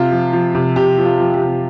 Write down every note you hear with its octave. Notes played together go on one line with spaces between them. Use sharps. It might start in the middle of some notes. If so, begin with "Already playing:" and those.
Already playing: C3 F4
F3
F3
C3
C3 G4
F3
F4
F3
G4
C3